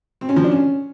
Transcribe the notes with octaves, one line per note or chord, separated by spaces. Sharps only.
C4
C#4
F3
D4
C#4